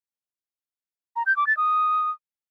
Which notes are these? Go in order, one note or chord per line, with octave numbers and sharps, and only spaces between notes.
A#5
G6
D6
A6
D#6